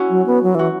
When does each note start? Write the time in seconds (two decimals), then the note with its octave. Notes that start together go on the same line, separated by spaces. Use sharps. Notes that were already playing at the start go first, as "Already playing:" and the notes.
Already playing: C#4 E4 F#4
0.10 F#3
0.26 B3
0.43 F#3
0.55 E3 F#4